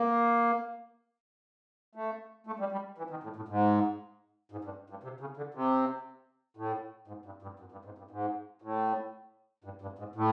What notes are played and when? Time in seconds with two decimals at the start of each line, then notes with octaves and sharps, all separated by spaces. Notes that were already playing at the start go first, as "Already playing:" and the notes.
Already playing: A#3
1.95 A3
2.47 A3
2.59 G3
2.72 G3
2.98 E3
3.10 D#3
3.24 A2
3.36 A2
3.49 G#2
4.52 G#2
4.64 G2
4.90 G2
5.03 C3
5.20 C#3
5.37 D3
5.54 C3
6.57 A2
7.08 G#2
7.26 G2
7.42 G2
7.60 F#2
7.72 G2
7.85 G#2
7.98 G2
8.11 G#2
8.62 A2
9.64 G2
9.82 G2
9.99 G#2
10.16 A2